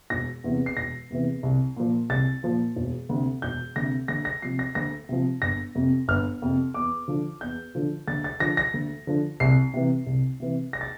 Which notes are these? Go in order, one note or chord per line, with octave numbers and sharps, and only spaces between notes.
E1 A#6
E2 C3 E3
C7
E1 A#6
E2 C3 E3
C2
A#2 F3
C2 A6
A#2 F3
E1
D2 C3
E1 G6
D2 C3 A#6
D2 A#6
A#6
C3 F3 C7
A#6
D2 A#6
C3 F3
G1 A#6
F2 C3
G1 F6
F2 C3
E2 D6
D3 F3
E2 G6
D3 F3
D2 A6
A6
D3 F3 A#6
A#6
D2
D3 F3
C2 C7
C3 E3
C2
C3 E3
A#6
A6